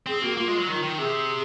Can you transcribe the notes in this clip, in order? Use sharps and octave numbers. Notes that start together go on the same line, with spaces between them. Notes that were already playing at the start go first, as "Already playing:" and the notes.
C4 G#4
A#3 F#4
A#3 F4
G#3
F#3
D#3
D#3
C3 G#4